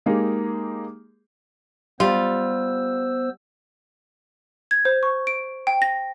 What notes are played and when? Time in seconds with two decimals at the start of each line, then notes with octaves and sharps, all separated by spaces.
0.06 G#3 A#3 D#4 G4 G#4
2.00 G3 B3 F4 C5 E6
4.71 G#6
4.85 C5
5.03 C#6
5.27 D7
5.67 G5
5.82 A#6